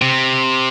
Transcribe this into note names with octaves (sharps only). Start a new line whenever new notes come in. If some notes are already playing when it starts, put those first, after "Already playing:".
C3